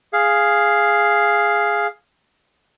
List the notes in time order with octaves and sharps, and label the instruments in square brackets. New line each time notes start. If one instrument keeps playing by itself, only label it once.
[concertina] G#4 F5